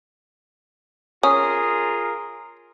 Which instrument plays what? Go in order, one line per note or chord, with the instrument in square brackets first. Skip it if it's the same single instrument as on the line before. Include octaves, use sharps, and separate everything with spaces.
[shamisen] C#4 [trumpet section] F4 G#4 A#4 [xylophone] D#6